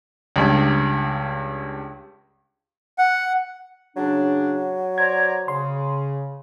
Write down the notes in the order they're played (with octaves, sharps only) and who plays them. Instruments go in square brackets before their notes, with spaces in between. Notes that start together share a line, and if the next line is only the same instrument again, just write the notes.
[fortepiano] C#2 G2
[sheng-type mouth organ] F#5
[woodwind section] C#3 D4 [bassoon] F#3
[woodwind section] C5 D5 A#5 [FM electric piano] G#6
[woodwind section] C#3 [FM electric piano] C6